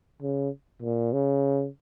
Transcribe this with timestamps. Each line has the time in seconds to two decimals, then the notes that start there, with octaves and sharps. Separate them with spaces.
0.22 C#3
0.82 A#2
1.13 C#3